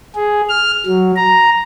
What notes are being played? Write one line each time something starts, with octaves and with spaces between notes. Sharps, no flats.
G#4
F6
F#3
A#5